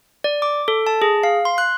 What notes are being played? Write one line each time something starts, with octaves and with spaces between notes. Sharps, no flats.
D5
D6
A4
A5
G#4
F5
C6
F#6